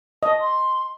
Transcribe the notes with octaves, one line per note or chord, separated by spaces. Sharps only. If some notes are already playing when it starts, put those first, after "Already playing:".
D#5 A5
C6